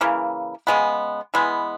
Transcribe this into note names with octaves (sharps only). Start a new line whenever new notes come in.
C#3 E3 A#3
C#3 G#3 B3
E3 G#3 B3